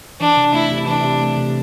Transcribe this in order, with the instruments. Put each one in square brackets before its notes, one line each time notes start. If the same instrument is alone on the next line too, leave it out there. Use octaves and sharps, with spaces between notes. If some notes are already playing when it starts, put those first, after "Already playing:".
[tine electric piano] E3 [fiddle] D4
[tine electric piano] C3
[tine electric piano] A3 [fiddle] E4
[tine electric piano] C3
[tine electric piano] E3 [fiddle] D4
[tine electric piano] C3
A3
C3